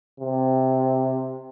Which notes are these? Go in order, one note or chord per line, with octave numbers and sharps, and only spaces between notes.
C3